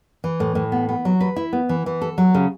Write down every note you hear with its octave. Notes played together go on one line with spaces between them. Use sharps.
E3
A2
A2
B3
B3
F#3
B4
E4
B3
E3
E3
A4
F#3
C#3